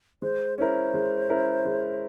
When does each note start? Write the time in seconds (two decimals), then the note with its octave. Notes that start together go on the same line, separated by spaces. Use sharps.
0.22 G#3 C5
0.58 C#4 E4 A#4 C5
0.94 G#3
1.29 C#4 E4 A#4
1.66 G#3